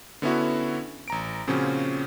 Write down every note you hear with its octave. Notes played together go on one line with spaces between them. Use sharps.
D3 B3 C#4 E4 F#4
A1 A#5 D7
A#2 C#3 F3 C4 C#4 F#4